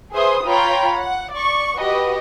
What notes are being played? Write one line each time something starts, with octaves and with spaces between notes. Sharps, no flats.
G#4 B4 C5 E5 C6 D#6
F4 C#5 G5 A#5 B5
F#5
D5 C#6
F#4 G4 B4 D#5